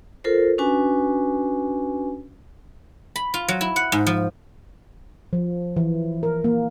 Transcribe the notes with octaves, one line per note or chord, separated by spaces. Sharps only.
F4 A4 A#4 C5
C#4 D4 F#4 B4 G#5
B5
F4
F#3
E4
F#5
G#2
F3
F3
E3
A#4
A#3